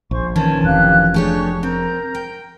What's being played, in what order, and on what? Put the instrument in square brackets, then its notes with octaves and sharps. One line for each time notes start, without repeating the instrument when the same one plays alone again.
[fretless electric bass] A#1 [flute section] G#4 C5 C#6
[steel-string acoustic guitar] D#3 E3 C#4 [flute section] A5
[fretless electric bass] F1 F2 [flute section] G4 F5 F#6
[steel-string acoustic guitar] A3 G4 C#5 [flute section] D4 G#4 C#6
[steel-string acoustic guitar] C4 [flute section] A#4 A#5 G6
[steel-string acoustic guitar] G5